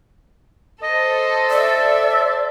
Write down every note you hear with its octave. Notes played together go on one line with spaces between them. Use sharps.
A4 C5 D#5
D5 E5